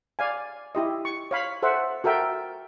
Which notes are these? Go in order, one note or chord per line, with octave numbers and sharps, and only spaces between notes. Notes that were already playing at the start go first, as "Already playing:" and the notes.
D5 F5 G#5
E4 G4 D#5
C#6
C#5 F5 B5
A4 C5 E5 F#5
F#4 A4 A#4 E5 G5